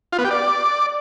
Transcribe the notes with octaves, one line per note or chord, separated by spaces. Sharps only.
F4
B3
G4
D5